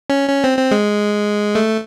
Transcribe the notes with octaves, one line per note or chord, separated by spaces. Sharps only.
C#4
C#4
C4
C4
G#3
A3